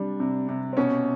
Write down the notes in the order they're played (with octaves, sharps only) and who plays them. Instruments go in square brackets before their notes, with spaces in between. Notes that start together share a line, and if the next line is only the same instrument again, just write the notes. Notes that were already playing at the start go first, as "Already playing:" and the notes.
Already playing: [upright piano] C3 G3 [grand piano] D4
[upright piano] C3
C3
[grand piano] C4
[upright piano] B2 [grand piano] C#4